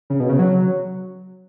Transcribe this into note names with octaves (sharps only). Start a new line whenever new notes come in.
C#3
B2
C#3
F#3